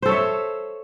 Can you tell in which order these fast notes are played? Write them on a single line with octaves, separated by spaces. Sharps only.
C5 A4 C#5 E5